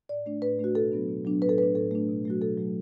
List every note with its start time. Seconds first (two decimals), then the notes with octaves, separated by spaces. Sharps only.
0.09 A2 D5
0.26 A3 D4
0.42 A2 B4
0.59 A3 D4 F#4
0.75 B2 A4
0.92 F#3 B3 D4
1.09 B2
1.25 F#3 B3 D4
1.42 A2 B4
1.49 A4
1.58 A3 D4 B4
1.75 A2 A4
1.91 A3 D4
2.09 B2
2.25 F#3 A3 F#4
2.42 B2 A4
2.57 F#3 A3